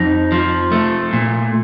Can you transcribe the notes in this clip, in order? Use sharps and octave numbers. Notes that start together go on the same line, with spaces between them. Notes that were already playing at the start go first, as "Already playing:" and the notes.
Already playing: F2 D#4
F3
A3
A#2